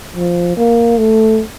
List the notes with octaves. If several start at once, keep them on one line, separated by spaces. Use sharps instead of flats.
F3
A#3
A3